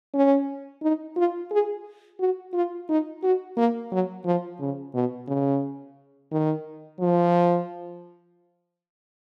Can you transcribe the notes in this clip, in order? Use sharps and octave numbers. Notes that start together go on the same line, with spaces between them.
C#4
D#4
F4
G#4
F#4
F4
D#4
F#4
A#3
F#3
F3
C#3
B2
C#3
D#3
F3